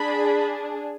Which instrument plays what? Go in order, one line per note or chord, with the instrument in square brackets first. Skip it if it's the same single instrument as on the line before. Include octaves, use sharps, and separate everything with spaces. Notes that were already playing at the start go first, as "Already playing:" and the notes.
Already playing: [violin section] D4 G#4 B5